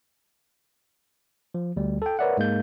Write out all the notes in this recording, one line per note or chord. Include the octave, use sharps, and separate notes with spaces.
F3
D2 G3
A4 G5
A#4 B4 C#5 D5 E5 F#5
G#2 G#3 A#3 G6